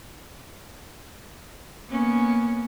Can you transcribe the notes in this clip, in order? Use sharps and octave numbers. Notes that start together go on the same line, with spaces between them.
A#3 B3 C#4